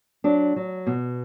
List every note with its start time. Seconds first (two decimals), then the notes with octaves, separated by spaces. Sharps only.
0.24 F#3 D4
0.56 F#3
0.87 B2